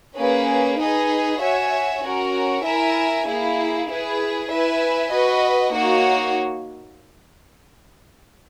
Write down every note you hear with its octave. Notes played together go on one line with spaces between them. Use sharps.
A#3 C#4 G#4 B4
D#4 G#4 B4 D#5
F#4 C#5 E5 G#5
C#4 F#4 A#4
E4 A#4 E5 G#5
A#3 E4 G#4
E4 G#4 B4
E4 B4 E5 G#5
F#4 B4 D#5
A#3 D#4 F#4 C#5